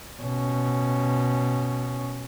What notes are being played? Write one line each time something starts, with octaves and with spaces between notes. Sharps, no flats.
B2 C#4